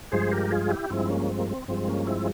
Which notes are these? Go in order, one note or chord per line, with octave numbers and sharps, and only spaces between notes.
G2 F3 G#3 G#4 C5
G4 A#4
F4 G#4
E4 G4
G2 F3 G#3 C4 E4
A#3 C#4
C4
A#3
C4
G2 F3 G#3 C4
A#3 C#4
C4 E4